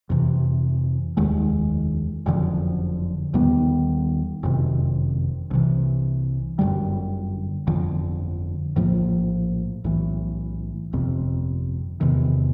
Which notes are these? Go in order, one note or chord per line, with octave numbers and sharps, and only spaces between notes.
F2 C3 E3
F1 D#2 D#3 G#3
F#1 F2 D3 F3
D#2 D#3 G3 B3
F#1 F2 C3 D#3
C2 C3 E3
G1 F#2 D3 G3
G1 F2 D3 F3
A#1 A2 F3 A#3
B1 A2 E3
G1 F2 C3
E2 C3 D#3